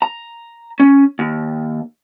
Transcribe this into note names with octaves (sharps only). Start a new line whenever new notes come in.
A#5
C#4
D#2